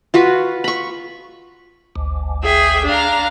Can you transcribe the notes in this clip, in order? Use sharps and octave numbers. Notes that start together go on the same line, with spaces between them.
F4 F#4 B4
B5 C#6
G#1 D2
G#4 E5 G5
D4 F5 A#5